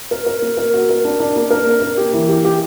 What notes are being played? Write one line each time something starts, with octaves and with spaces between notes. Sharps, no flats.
A#4
A#4
A#3
A#4
F#4
A#4
D4
D4
A#3
A#4
A#3
A#3
G4
E3
G4
G4